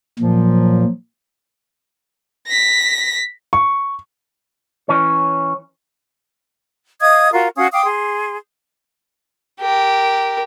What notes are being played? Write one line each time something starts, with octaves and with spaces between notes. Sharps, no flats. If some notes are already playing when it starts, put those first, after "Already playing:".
A#2 F3 F#3
A#6 B6
C#6
E3 C#4 C#5
D#5 F5 D#6 G#6
F4 F#4 A#4 F5
C#4 F#4 F5 D#6
F5 G5 D6 D#6
G#4 C6
G4 A#4